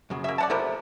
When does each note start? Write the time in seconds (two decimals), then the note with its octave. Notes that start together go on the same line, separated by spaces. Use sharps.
0.10 F#2 C#3
0.24 A#3 E5
0.38 D5 F#5 A5
0.50 C3 F3 A3 B3 A#4